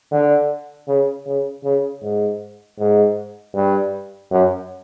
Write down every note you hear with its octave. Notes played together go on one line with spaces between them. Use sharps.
D3
C#3
C#3
C#3
G#2
G#2
G2
F#2